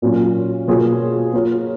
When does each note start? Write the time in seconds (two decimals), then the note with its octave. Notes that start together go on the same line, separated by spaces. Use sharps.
0.02 A#2 F#3 A#3 C#4 F4
0.67 B2 A#3 F4 G#4 C#5
1.33 A#3 F4 A#4 C#5